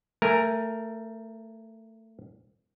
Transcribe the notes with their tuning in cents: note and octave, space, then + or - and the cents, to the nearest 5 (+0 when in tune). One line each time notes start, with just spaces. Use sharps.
A3 +20 A#4 +0 G#5 -5